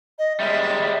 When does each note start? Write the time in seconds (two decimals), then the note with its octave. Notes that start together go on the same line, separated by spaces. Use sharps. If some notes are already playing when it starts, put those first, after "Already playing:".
0.19 D#5
0.40 G3 G#3 E5